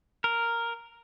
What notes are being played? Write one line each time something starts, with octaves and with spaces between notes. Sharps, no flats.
A#4